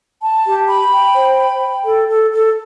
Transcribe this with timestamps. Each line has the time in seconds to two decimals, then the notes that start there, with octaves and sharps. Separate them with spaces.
0.22 A5
0.46 G4
0.68 B5
0.91 G5
1.14 C5
1.38 B5
1.61 G5
1.85 A4
2.08 A4
2.31 A4